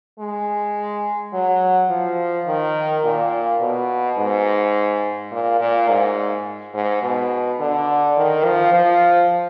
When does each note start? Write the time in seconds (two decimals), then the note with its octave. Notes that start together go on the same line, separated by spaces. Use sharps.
0.20 G#3
1.33 F#3
1.90 F3
2.47 D#3
3.04 A#2
3.61 B2
4.18 G#2
5.31 A#2
5.61 A#2
5.89 G#2
6.74 G#2
7.03 B2
7.60 D3
8.17 D#3
8.45 F3
8.74 F3